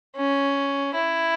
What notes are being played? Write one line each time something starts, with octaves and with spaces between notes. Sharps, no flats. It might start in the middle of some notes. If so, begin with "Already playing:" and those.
C#4
E4